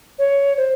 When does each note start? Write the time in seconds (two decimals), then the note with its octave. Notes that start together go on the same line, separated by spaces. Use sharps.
0.19 C#5
0.57 C5